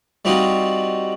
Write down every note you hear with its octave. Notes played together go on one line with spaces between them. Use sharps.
G3 C4 D#4 F4 F#4